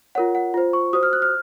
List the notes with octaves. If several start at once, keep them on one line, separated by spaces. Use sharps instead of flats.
F4 A#4 C#5 F#5
F#5
F4 C5
C#6
F#4 C5 D#6
F6
F#6
F6